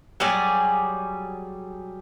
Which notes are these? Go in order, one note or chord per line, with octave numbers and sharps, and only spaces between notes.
F#3 G3 G#4 D5